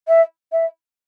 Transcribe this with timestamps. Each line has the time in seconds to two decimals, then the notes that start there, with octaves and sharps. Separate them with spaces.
0.08 E5
0.52 E5